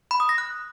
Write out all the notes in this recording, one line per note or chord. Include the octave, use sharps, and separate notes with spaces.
B5
D#6
A#6
F#6